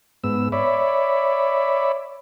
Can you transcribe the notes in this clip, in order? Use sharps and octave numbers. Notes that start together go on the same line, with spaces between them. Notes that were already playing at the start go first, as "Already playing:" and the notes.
G#2 B3 E6
C#5 D5 E5 B5